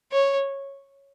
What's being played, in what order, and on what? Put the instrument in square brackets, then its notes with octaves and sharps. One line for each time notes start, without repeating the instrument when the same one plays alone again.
[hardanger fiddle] C#5